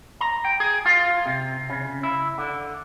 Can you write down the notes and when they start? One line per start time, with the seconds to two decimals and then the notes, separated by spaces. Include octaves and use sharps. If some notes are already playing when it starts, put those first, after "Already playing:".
0.21 A#5
0.45 G5
0.60 G#4
0.86 F4
1.26 C3
1.70 C#3
2.03 E4
2.38 D3